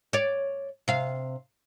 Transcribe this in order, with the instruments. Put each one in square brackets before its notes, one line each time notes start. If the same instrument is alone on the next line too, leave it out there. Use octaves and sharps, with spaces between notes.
[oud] C#5 D5
C3 F5